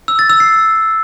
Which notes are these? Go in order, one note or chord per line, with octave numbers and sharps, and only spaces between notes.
E6
A6
E6
C7